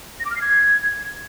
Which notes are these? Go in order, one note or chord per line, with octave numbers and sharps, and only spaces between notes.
A#6
D6
F6
C7
G#6